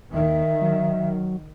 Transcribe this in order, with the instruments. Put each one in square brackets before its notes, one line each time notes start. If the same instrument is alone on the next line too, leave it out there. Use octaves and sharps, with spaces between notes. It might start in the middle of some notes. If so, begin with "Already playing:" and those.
[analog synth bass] D#2 [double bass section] D#3 [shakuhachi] E5
[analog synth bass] F#3